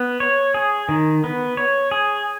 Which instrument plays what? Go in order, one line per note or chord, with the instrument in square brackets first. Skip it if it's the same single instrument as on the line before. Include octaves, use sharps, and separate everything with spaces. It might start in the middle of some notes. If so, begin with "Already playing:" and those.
Already playing: [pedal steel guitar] B3
C#5
G#4
D#3
B3
C#5
G#4